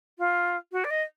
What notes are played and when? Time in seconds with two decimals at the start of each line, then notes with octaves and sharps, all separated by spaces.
0.19 F4
0.72 F#4
0.84 D5
0.91 D#5